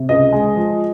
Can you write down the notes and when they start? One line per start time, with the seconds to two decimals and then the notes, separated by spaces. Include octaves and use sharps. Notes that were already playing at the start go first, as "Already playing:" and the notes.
Already playing: C3
0.09 C#2 D#5
0.32 G#3
0.56 F3